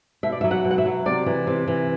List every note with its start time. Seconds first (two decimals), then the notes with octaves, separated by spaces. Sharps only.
0.23 B2 E5
0.32 D5
0.41 E5
0.44 F#3
0.51 F#5
0.64 B2
0.71 F#5
0.78 E5
0.86 F#3
1.06 C3 D5
1.26 E3
1.47 C3
1.67 E3